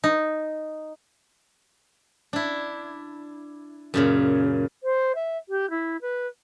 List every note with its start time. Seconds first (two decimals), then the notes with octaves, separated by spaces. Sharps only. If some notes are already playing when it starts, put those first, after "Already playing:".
0.04 D#4
2.33 D4 E4
3.94 F#2 A#2 C#3
4.83 C5
5.15 E5
5.49 G4
5.70 E4
6.02 B4